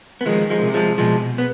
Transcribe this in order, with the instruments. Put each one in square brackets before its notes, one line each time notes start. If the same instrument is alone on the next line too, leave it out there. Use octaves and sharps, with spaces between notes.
[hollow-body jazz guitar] B3
[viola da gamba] D#3 [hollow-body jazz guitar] F3 G#3
[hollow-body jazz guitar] F3 G#3
[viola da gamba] C3
[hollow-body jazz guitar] F3 G#3
[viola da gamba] B2 [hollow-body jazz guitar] F3 G#3
[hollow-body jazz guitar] B3